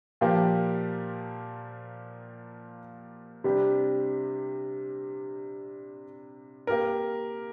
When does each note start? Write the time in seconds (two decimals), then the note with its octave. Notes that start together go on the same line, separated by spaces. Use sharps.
0.21 A#2 F3 A#3 G4
3.44 C3 G3 D4 G4
6.67 A#3 G4 A#4